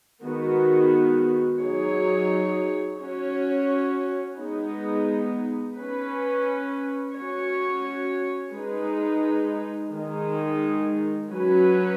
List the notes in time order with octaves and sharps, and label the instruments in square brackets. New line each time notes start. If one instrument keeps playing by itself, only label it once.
[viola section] D#3 G#3 B3 D#4 F#4
F#3 D#4 G#4 C#5
C#4 F#4 C#5
G#3 B3 D#4
C#4 B4
C#4 F#4 C#5
G#3 D#4 B4
D#3 G#3 D#4
F#3 C#4 F#4 B4